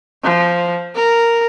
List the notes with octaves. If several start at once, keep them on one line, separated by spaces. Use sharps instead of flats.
F3
A#4